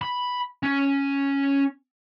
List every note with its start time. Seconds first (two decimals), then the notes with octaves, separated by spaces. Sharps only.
0.02 B5
0.63 C#4